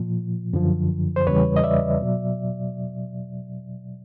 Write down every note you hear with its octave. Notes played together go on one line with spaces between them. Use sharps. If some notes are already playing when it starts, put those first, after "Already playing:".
Already playing: A#2 F3
F#2 D3 F3
C5
E2 C#3 E3 G3 B4 C#5
D#5
D5 E5
B2 F#3